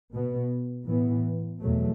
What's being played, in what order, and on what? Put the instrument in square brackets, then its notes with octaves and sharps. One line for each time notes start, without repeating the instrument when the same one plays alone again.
[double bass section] B2 B3
A2 E3 B3
E2 B2 F#3 A3